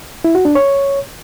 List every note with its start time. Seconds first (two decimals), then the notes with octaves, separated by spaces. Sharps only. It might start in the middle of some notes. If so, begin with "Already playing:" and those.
0.24 E4
0.35 F#4
0.45 D4
0.55 C#5